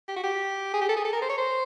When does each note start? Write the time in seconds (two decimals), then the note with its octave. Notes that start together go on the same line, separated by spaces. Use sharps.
0.08 G4
0.16 F#4
0.23 G4
0.73 G#4
0.81 G4
0.89 A4
0.97 G#4
1.05 A4
1.13 A#4
1.22 C5
1.29 C#5
1.38 C5